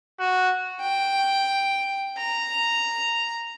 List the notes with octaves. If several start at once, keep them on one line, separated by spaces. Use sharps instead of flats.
F#4
G5
A#5